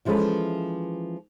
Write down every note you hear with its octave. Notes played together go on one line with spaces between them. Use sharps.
E3 F3 G#3 C#4 A4 B4